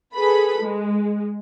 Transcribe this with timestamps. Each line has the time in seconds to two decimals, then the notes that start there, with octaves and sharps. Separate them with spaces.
0.14 G#4 A4 B4 B5
0.61 G#3